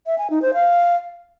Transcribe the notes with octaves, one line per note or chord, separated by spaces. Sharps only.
E5
G#5
D#4
C5
F5